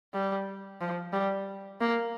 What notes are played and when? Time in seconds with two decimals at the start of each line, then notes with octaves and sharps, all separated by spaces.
0.14 G3
0.81 F3
1.13 G3
1.81 A#3